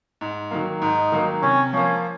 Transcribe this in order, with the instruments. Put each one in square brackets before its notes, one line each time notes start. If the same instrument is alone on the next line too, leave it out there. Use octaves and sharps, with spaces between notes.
[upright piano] G#2
D#3 F#3 A#3
[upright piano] G#2 [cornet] D#4
[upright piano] D#3 F#3 A#3
[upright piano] C3 [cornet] C#4
[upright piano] F3 A#3 [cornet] C#4